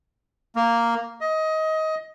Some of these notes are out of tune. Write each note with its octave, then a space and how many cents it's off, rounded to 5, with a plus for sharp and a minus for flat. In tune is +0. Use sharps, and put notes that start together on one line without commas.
A#3 -5
D#5 +20